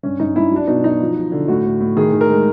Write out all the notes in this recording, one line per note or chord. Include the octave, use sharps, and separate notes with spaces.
G2 C#4
G2 D#4
G2 E4
F#3 D4
B2 D#4
F#3 D#4
F3
F3
D3
A2 F#4
A2
A2
D#3 G#4
D#3
A#4
G#3